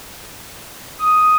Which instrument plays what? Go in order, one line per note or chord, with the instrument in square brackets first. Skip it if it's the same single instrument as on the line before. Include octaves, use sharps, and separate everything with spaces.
[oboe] D#6